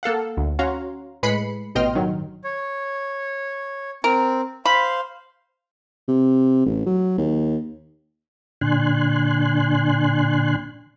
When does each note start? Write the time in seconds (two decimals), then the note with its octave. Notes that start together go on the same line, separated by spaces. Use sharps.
0.03 A#3 A4 F5 F#5
0.37 D2
0.59 C#4 F#4 C#5 F5 A#5 C6
1.23 A2 G#3 B4 B5 C7 C#7
1.75 A1 B2 D#5 G5 C6 F6
1.95 G2 D#3 F#3
2.44 C#5
4.04 C4 A#4
4.66 C5 F5 B5
6.08 C3
6.66 A1
6.86 F#3
7.18 D#2
8.61 A#2 D3 D4 G#5 C6 F#6